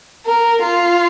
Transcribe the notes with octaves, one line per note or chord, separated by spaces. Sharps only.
A#4
F4